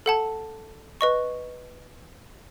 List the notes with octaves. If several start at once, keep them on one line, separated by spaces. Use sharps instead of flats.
A4 F#5 A5
B4 D#5 C#6